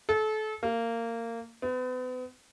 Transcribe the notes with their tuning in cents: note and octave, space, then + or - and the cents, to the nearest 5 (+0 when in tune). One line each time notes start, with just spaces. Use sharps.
A4 -30
A#3 -20
B3 +40